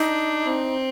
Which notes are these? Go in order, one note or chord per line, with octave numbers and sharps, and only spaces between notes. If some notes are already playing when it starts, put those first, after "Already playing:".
Already playing: D4 D#4
C4